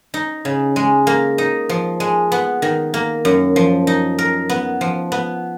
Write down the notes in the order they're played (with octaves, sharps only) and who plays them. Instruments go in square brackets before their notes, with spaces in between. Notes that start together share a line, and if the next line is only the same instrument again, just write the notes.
[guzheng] D#4
C#3
G#3
A#3
D#4
F3
G#3
B3
D#3
A#3
F#2
F3
D#4
A#4
B3
F3
B3